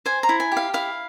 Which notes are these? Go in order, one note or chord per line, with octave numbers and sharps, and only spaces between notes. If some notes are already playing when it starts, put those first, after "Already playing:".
C5 G#5
A#5
E4
G#5
G4
F5
E4 F5